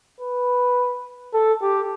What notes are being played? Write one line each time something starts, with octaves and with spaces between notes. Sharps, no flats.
B4
A4
G4